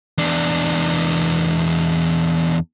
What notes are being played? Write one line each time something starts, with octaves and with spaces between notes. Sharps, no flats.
E2 D4